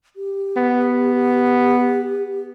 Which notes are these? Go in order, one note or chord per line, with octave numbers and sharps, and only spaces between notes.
G4
B3